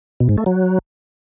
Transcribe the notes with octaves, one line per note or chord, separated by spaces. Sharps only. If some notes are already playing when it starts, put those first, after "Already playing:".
B2
G#2
A3
F#3